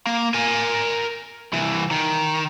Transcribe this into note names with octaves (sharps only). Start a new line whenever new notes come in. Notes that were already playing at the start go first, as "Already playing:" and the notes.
A#3
A#4 G#5
C2 E3
D#3